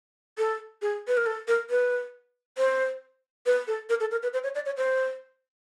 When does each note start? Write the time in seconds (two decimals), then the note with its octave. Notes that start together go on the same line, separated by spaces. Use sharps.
0.38 A4
0.82 G#4
1.08 B4
1.17 A#4
1.26 A4
1.48 A#4
1.70 B4
2.58 C5
3.46 B4
3.67 A4
3.89 A#4
4.00 A4
4.11 A#4
4.23 B4
4.33 C5
4.44 C#5
4.55 D5
4.66 C#5
4.77 C5